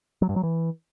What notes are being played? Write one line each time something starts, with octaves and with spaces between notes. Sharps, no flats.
F#3
G2
F#3
E3